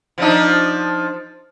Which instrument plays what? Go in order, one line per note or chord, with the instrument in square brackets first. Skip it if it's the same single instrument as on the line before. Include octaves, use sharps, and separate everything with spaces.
[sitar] F3 D4 D#4